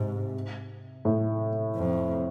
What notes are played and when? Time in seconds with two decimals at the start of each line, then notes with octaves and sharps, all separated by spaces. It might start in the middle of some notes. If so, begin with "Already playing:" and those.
Already playing: G#2 C3
1.05 A2
1.75 F2